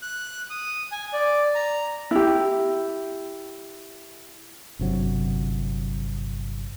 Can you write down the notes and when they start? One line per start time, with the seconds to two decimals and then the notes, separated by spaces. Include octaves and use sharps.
0.02 F#6
0.50 D#6
0.92 G#5
1.13 D5
1.55 A#5
2.11 E4 G4
4.79 G1 C3 F#3